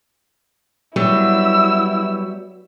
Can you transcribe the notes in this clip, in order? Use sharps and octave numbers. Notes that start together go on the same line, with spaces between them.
F#3 G3 B3 E4 E6